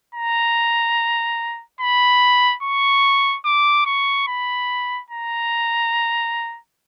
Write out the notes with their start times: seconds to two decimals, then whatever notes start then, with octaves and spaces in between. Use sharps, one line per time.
0.14 A#5
1.80 B5
2.63 C#6
3.45 D6
3.86 C#6
4.27 B5
5.10 A#5